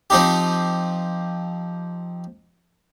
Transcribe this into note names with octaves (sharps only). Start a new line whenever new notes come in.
F3 C4 D#4 G4